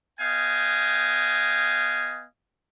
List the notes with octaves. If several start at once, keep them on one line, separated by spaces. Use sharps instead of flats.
B3 D#5 F5 G5 G#5